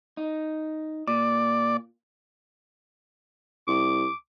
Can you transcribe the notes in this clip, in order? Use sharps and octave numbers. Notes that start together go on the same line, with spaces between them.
D#4
A#2 D5
C2 D6